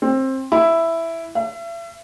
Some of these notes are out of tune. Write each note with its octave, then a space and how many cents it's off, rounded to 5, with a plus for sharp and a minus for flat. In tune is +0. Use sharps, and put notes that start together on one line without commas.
C4 +20
E4 +5
E5 +40